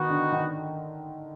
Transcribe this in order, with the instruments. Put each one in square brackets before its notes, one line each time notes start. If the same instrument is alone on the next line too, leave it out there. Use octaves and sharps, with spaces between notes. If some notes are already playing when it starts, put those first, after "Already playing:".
Already playing: [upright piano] D#3 [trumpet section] B3 D#4 F#4
[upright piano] D3
D#3